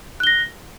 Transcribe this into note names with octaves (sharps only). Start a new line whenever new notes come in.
F#6 A#6 G7